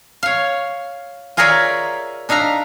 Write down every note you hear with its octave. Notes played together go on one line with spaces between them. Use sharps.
C#5 F5
F4 G#4 A#4 C#5 D5 E5
D4 D#4 E5 F5 A#5